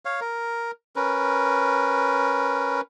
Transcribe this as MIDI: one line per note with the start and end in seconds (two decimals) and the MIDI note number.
0.05 0.20 73
0.05 0.20 77
0.21 0.71 70
0.96 2.81 61
0.96 2.81 70
0.96 2.81 71